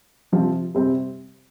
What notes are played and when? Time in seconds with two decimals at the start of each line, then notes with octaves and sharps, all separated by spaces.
0.32 C3 F3 C4
0.75 C3 G3 C4